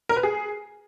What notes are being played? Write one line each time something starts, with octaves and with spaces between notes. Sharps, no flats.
A#4
B4
G#4